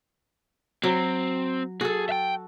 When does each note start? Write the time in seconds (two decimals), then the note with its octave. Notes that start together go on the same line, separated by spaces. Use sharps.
0.83 F#3 C4
1.81 F#4 G#4 A4
2.09 E5 G5